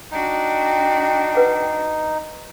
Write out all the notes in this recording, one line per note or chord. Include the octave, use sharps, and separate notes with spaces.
D4 D#4 F#4 G5
B4 F#5 D6